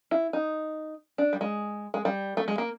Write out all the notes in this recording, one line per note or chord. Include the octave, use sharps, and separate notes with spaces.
E4
D#4
D4
G3
G#3
G#3
G3
A3
G#3
A#3